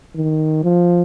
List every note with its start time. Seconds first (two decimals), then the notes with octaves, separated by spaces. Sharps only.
0.15 D#3
0.64 F3